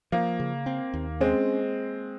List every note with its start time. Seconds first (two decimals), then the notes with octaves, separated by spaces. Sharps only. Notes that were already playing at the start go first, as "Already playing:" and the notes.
0.12 F3 A#3
0.40 C#3
0.66 C4
0.94 D#2
1.20 G#3 C4 C#4